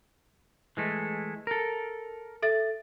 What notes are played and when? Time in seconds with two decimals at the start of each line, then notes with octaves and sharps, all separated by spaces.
0.77 E3 G#3 A3
1.47 A4 A#4
2.43 A4 E5 A6